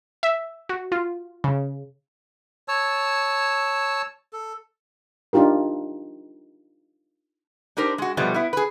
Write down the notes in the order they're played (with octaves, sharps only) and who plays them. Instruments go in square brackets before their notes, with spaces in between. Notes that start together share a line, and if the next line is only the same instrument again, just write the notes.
[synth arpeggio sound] E5
F#4
F4
C#3
[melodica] C#5 A5 E6
A4
[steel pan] D4 D#4 F4 G4 A#4
[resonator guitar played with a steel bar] D4 D#4 G4 A#4 C5
G#3 F#4
B2 F3 G3 A3 B3
B3 E4
G#4 B4